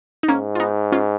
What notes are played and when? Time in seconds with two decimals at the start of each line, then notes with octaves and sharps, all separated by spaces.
0.23 D#4
0.28 G#2 A#3 C#4
0.55 F4
0.60 B3 D#4
0.92 C#4 F4